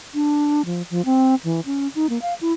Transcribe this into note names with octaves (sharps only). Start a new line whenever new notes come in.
D4
F3
F3
C4
E3
C#4
D#4
A#3
F5
E4